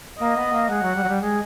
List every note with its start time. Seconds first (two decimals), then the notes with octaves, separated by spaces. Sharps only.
0.19 A#3 D#5
0.36 B3
0.52 A#3
0.69 G#3 F#5
0.82 F#3
0.95 G3
1.03 F#3
1.08 G3
1.21 G#3